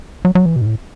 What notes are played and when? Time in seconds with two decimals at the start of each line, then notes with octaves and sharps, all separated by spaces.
0.25 F#3
0.35 F#3
0.46 E3
0.56 B2
0.61 G#2
0.66 A2